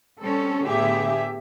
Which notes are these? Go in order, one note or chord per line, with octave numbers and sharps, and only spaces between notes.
G3 C4 C#4 A4
A2 D3 B3 G4 G#4 E5